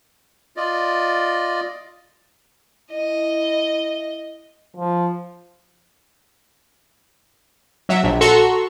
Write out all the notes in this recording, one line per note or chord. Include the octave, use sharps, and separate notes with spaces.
F4 D5 D#5
E4 D#5
F3
F#3 E5
A#1
F#4 A4 A#5 C6 C#6 E6